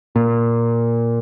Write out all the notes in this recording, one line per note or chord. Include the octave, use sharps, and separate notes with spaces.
A#2